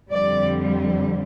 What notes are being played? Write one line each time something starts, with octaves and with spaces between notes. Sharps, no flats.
F2 D3 G3 D5